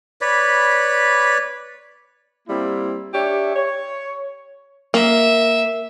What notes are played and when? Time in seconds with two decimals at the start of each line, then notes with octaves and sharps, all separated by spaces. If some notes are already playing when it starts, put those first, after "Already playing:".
0.21 B4 C#5 D5 B5
2.48 G3 A#3 C4 E4
3.14 D4 G4 C#5 E5
3.56 C#5
4.94 A#3 E5